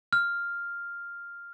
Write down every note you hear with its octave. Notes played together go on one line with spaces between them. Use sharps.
F6